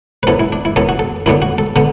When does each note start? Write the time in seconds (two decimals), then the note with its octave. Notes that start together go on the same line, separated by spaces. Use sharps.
0.23 B4
0.27 F#2 E3 B3 A4
0.40 E4
0.52 D4
0.65 E4
0.76 F#2 E3 B3 A4
0.89 F#4
0.99 A4
1.26 F#2 D3 B3 D4 E4
1.42 F#4
1.58 A4
1.76 D3 B3 A4